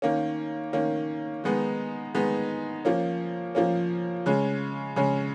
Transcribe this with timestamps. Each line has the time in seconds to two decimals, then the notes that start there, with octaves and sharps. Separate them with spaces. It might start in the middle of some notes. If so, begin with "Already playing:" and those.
0.02 D#3 A#3 C#4
0.73 D#3 A#3 C#4
1.44 D#3 G#3 B3 D#4
2.14 D#3 G#3 B3 D#4
2.85 F3 A#3 C#4
3.55 F3 A#3 C#4
4.26 C#3 G#3 C#4
4.96 C#3 G#3 C#4